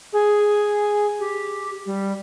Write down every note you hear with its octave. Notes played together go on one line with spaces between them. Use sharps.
G#4
G4
G3